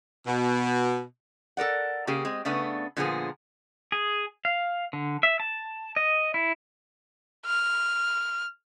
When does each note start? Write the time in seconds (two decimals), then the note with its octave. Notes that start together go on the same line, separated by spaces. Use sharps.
0.25 B2
1.57 A4 A#4 D5 F#5
2.07 C#3 A#3 G4 G#4
2.25 G#3 C4
2.45 C#3 A3 B3 D4 B4
2.97 A#2 D3 F3 A#3 B3 G#4
3.92 G#4
4.45 F5
4.93 D3
5.23 E5
5.40 A5
5.96 D#5
6.34 E4
7.47 F6